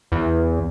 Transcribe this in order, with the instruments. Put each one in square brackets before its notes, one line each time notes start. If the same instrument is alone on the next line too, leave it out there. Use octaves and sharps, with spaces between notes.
[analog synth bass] E2